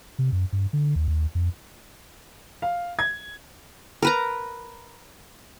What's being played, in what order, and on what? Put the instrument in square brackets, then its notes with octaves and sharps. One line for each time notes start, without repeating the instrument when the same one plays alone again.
[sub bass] C3
F#2
G2
D3
D#2
D#2
F2
[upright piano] F5
G#6
[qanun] A#4 B4 A#5